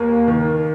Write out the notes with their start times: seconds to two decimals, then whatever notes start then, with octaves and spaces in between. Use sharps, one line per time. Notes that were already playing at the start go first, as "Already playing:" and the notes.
Already playing: D#2 A#3
0.28 D#3